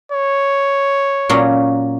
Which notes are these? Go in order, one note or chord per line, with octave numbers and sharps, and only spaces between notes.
C#5
A#2 F#3 C#4